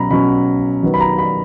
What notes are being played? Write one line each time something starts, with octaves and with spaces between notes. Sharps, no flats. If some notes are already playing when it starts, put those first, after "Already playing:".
Already playing: B2 F#3 C#4 A#5 B5
B2 F#3 C#4 B5
D#3 F#3 B3
B5
A#5
B5